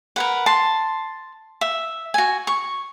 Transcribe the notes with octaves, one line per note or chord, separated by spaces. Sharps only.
A#4 B4 F#5
A5 C6
E5
F#4 G#5
C#6